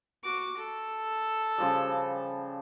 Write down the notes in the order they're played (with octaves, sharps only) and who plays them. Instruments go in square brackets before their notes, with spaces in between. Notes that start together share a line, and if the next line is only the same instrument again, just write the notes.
[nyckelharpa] F#4 D6
A4
[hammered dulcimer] C#3 F3 G3